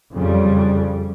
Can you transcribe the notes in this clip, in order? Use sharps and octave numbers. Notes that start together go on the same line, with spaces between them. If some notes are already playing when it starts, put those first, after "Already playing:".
F2 C#3 G3